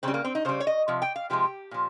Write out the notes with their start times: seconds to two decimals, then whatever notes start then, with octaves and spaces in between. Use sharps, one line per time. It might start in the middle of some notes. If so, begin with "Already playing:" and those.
0.03 C#3 G3 C4
0.14 A#3
0.24 C4
0.35 D#4
0.45 C#3 G3 C5
0.60 C#5
0.67 D#5
0.88 C3 F3
1.02 G5
1.16 F5
1.30 C3 F3 G#3 G4
1.71 A#2 F3